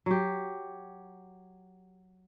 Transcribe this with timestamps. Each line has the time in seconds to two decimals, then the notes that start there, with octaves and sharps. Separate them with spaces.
0.06 F#3 G4